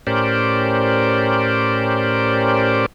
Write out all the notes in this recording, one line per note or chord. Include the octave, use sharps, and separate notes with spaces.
A2 C#4 G4 A#4 C5 D5